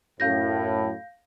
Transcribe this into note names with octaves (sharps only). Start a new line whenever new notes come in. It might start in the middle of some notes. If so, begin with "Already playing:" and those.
F#2 A2 F5 G6 A#6